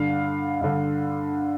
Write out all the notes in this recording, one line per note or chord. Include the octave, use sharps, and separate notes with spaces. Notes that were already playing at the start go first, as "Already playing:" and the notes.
Already playing: G2 D3 F5
G2 D3